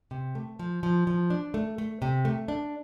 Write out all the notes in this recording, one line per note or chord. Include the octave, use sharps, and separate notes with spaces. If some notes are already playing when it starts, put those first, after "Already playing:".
C3
A3
F3
F3
F3
D4
A3
A3
C3
A3
D4